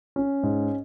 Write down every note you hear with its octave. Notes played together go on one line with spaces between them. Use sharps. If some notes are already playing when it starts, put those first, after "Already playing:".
C#4
G#2